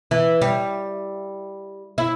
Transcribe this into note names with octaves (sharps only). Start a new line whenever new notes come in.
E3
G3
E4